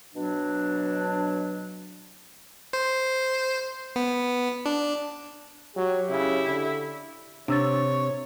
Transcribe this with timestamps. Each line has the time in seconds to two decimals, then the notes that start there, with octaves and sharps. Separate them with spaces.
0.15 B2 F#3 D4
2.73 C5
3.96 B3
4.66 D4
5.76 F#3 G4
6.10 C#3 E4
6.47 D3
7.48 C3 D4 C#5 E6 A6